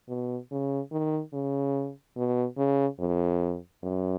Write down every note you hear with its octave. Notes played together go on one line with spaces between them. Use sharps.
B2
C#3
D#3
C#3
B2
C#3
F2
F#2